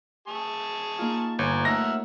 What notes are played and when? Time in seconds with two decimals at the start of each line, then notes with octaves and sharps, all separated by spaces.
0.28 G#4 A5 C#6
0.99 A#3 D#4 F4
1.39 G1 C#5 G#5 A#5
1.65 A3 D#4 A#4 E5 F#5 A#6